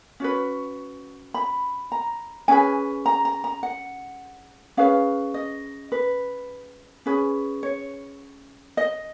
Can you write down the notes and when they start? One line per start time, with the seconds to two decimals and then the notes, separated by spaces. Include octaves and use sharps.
0.20 C#4 F#4 B4
1.34 B5
1.92 A#5
2.48 C#4 G#4 B4 G#5
3.06 A#5
3.25 A#5
3.44 A#5
3.63 F#5
4.77 C#4 G#4 B4 F5
5.34 D#5
5.92 B4
7.06 C#4 G#4 B4
7.63 C#5
8.77 D#5